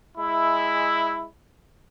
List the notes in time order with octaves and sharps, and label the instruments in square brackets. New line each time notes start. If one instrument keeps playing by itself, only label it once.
[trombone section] G#3 E4